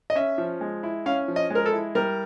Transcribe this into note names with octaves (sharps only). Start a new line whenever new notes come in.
D#5
C#4 E5
F3
G#3
E4
C#4 F5
F3
D#5
G#3 A#4
A4
E4
G3 A#4